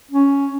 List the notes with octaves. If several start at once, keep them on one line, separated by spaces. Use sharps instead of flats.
C#4